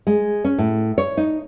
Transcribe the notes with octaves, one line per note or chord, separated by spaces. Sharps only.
G#3
C#4
A2
C#5
D#4